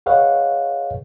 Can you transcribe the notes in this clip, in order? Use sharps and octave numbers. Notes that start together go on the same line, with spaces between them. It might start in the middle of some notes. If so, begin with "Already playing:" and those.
G#4 B4 C#5 D#5 F5 F#5